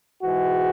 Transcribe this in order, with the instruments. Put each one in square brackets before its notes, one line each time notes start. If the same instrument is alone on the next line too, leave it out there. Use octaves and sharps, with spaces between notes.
[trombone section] G#2 E3 G#3 F#4